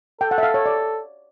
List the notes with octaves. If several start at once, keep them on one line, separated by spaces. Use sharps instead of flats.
A4 G5
F#5
E5
F5
C#5
D5